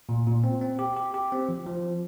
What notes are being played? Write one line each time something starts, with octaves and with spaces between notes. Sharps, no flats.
A#2
A#2
C4
C4
G4
G4
G4
C4
F3
F3